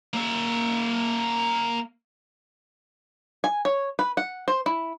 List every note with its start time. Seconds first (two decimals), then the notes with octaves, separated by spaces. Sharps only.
0.14 A#3 E5
3.44 G#5
3.65 C#5
3.99 B4
4.17 F#5
4.48 C5
4.66 E4